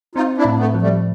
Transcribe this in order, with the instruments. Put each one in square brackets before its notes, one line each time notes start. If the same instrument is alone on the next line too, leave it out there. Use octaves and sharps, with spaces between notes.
[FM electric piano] C4 [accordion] D#4 F4
[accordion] D4 E4
[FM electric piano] A2
[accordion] A3 B3
[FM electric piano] F3
[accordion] G3 A3